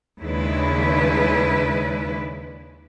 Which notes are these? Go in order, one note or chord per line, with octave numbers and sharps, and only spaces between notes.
D#2 C#3 G#3 D4 E4 B4